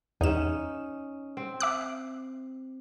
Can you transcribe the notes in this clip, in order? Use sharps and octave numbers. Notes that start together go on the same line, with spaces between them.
E2 C#4 D#4 E7
C4
E5 D6 F#6